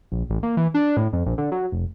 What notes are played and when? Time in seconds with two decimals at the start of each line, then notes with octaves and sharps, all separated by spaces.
0.12 A#1
0.30 A1
0.43 A#3
0.57 E3
0.74 D4
0.97 A2
1.13 F2
1.26 A#1
1.38 D3
1.52 F#3
1.72 F1